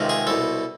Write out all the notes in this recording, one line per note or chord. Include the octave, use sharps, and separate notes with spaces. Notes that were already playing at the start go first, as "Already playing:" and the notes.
Already playing: C#2 C3 D#3
G#4
C2 B2 A4